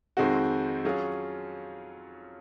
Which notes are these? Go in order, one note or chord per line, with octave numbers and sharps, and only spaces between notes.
F2 D#3 G#3 C4 F#4
F#3 C#4 F4 G#4